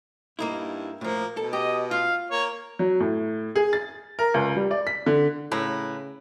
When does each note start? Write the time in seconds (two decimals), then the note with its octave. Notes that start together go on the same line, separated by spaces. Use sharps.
0.39 G2 A#3 D#4 E4
1.01 A2 F3 A#3
1.37 B2 A4
1.53 G4 D#5
1.91 F4 F5
2.31 A#3 C#5
2.79 F#3
3.00 A2
3.55 G#4
3.73 A6
4.19 A#4
4.34 C#2
4.56 G3
4.71 D5
4.87 B6
5.06 D3
5.52 A2 C#3 B4 A#5